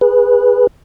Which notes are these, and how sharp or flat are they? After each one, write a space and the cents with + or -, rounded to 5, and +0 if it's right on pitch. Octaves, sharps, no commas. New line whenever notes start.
G#4 -20 B4 -10